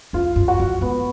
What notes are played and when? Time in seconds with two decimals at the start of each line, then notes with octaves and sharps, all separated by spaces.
0.13 F2 F4
0.36 F#2
0.48 F#4
0.60 F#2
0.81 G#2 B3